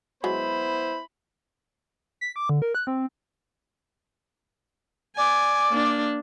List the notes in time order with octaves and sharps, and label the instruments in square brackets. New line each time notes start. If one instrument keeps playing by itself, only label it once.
[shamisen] F#3 G#3 [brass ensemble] B3 E4 C5 [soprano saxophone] B5
[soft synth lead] B6
D6
D3
A#4
F#6
C4
[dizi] D5 [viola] G#5
[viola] A#3 D4